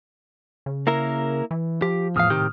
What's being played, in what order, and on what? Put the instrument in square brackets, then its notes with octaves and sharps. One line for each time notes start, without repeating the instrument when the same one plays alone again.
[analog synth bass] C#3
[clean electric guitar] A#3 E4 A#4
[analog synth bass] E3
[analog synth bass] F3 [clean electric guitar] G4
[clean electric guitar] E2 F5 [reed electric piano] A2 D#6 F6
[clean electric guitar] C3 D#3 G4